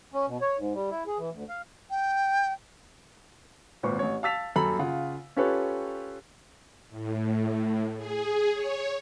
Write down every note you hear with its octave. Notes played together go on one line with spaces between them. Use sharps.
C#4
B2
C#5
G#2
G3
E4
G#4
E3
D2
F5
G5
G#1 A#2 C4 B4 C#6
A1 C#5
F5 A5 E6 A6 B6 F7
D#1 F#2 A4 A#5 B5 F#7
C#3 F4 F#5
C#4 F4 G4 A4 B4 C#5
A2
G#4
C#5